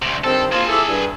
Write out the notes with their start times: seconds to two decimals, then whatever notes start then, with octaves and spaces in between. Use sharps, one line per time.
0.02 D2 C3
0.24 G2 D#3 C4 A4
0.52 A#3 C4 F4 G#4 A5
0.69 E4 G4 A4
0.88 G2